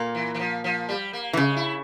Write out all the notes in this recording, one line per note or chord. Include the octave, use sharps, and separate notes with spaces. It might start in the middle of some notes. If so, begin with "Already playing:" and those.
Already playing: A#2 A#3
E3
E3
F3
F3
G3
A#3
E3
C#3 G#3
E4